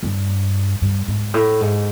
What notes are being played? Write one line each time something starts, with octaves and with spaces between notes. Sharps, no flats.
G2
G2
G#2
A2
G#2